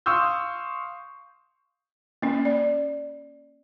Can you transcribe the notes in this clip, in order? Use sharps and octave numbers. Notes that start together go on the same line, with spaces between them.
F5 C6 C#6 D#6 E6 G6
A#3 C#4
D5